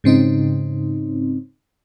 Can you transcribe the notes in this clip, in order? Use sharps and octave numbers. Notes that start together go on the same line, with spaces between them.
G#2 C#3 C4 D#4